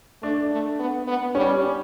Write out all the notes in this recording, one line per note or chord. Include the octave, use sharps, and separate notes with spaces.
A3 D4
A3
B3
B3
G3 C#4